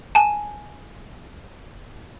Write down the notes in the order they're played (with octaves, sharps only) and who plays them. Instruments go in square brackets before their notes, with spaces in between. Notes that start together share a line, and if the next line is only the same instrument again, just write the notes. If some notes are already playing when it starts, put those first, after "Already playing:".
[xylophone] G#5 A5